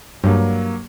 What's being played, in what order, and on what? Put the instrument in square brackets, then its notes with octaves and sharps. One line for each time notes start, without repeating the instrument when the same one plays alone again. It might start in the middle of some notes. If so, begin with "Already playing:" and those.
[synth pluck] G2 [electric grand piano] F#3 A#3